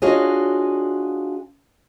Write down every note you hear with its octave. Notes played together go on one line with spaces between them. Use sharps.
D4 F4 F#4 G#4 C#5 D#5